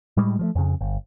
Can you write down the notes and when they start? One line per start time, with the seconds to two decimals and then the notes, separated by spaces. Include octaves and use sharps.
0.17 A2 G3 G#3
0.39 F3 F#3 A3
0.55 F2 C#3
0.81 G1